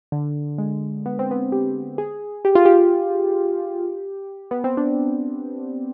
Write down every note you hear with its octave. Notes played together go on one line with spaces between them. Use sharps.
D3
G#3
B3
C4
B3
G4
G#4
G4
F4
G4
B3
C4
D4